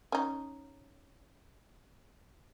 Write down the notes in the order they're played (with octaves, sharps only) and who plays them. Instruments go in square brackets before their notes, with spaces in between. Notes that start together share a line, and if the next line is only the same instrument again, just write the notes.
[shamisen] C#4 D#4